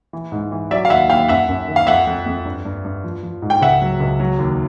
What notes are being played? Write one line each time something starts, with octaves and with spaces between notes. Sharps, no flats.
E3
G#2
E3
F#3 D5 E5
F5
D#2 E5 F#5
D#2 F5 G5
F#2 E5 F#5
F#2
D#3
F5
F2 E5 F#5
F2
F2
G2
G2
G2
F3
F3
G#2
G5
C#2 E5 F#5
F#3
C#2
F#3
D#2